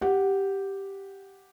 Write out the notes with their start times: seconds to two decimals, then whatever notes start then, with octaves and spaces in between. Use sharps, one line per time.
0.01 G4 F#5